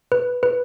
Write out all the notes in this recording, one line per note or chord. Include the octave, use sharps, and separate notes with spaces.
B4
B4